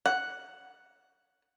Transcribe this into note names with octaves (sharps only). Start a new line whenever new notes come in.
F#5